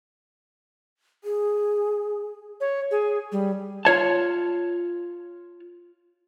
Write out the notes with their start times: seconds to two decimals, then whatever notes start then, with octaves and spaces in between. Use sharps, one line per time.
1.24 G#4
2.61 C#5
2.91 G#4
3.32 G3
3.85 F4 C#5 A5